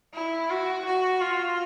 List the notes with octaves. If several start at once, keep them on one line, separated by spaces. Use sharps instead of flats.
E4
F#4
F#4
F4